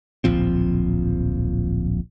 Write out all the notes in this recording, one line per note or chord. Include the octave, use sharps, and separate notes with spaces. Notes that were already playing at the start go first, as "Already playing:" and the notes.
D1 A#1 F3 C4